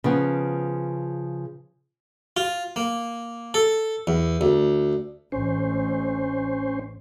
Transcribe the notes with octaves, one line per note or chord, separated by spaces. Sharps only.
C#3 F3 B3
F4
A#3
A4
E2
D2
A1 C#4 C5